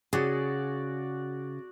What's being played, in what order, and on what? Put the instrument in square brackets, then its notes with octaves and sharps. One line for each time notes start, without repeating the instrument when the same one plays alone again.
[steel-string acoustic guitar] C#3 [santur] F#4 D5 [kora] G#4